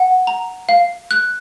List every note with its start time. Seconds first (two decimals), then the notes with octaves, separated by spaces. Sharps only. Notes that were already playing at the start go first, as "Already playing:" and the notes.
Already playing: F#5
0.27 A#5
0.69 F5
1.11 F#6